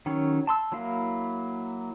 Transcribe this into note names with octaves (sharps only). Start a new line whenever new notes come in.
D#3 F#3 C#4 C#5
A5 C6 E6
F#3 A#3 E4 F5